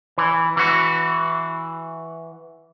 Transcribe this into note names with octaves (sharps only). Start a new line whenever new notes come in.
E3
E3 F#4